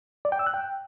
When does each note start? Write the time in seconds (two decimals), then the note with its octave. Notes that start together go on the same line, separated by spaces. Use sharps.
0.25 D5
0.32 G5
0.39 E6
0.47 F#6
0.54 G5